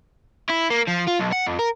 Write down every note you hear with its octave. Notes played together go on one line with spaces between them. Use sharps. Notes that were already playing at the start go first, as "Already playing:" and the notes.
E4
A#3
F3
F4
B1
F#5
F2
A#4